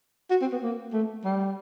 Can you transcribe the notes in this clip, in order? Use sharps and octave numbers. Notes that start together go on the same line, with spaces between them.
F#4
C4
B3
A#3
A3
G3